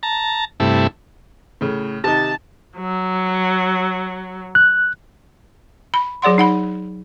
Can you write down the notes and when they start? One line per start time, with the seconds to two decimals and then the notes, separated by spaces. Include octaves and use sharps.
0.03 A5 A#5
0.60 G2 C3 A3 E4
1.61 A2 C#3
2.04 C3 D#3 D#4 A5
2.78 F#3
4.55 F#6
5.94 B5
6.22 F#3 G#4 D5 F#5 C6
6.38 D#4 F#5 B5